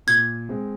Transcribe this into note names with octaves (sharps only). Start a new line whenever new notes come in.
A#2 G#6
G#3 C4